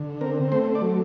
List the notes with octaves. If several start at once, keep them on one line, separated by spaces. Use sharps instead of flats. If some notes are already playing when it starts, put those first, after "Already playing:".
Already playing: D3
C4 A#4
A3 C5
D5
F#3